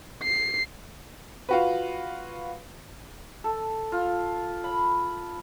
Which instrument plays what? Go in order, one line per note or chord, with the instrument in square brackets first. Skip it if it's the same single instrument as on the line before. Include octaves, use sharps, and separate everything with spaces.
[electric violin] C7
[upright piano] F4 F#4 B4
[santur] A4
F4
B5